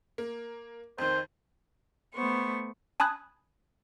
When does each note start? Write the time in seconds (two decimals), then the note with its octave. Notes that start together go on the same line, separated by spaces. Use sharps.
0.18 A#3
0.98 F2 D#3 C5
2.14 A3 B3 C5 C#6
3.00 G#5 A5 B5 D#6 F#6 G#6